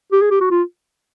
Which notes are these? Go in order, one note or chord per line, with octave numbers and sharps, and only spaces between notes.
G4
G#4
G4
F#4
F4